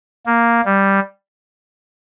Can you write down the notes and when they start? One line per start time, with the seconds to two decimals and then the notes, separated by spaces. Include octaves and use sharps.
0.26 A#3
0.65 G3